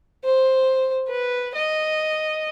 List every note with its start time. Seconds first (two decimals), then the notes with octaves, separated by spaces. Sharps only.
0.24 C5
1.08 B4
1.55 D#5